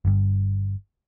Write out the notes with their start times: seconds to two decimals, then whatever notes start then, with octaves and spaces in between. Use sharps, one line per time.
0.05 G1 G2